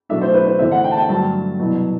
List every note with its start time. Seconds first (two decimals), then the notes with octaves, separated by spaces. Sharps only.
0.09 B2 F#3 A3 D4 E5
0.21 C5
0.34 B4
0.47 C5
0.59 E2 D3 A3 C4 E4 E5
0.72 F#5
0.84 G5
0.91 A5
0.97 G5
1.09 G2 D3 F#3 A3 A5
1.59 C2 B2 F#3 B3